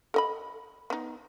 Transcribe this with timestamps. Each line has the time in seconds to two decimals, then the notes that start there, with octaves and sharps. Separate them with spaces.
0.14 A4 D#5 B5
0.90 B3 D#4